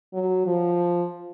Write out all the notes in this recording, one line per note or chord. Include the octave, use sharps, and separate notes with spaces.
F#3
F3